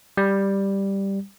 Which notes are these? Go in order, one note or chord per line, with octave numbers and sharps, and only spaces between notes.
G3